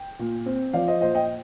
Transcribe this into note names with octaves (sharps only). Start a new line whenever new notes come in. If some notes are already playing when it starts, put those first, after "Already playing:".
Already playing: G5
A#2
C4
F3 D5 F5
C5 D#5
A#2 C5 D#5
D#5 G5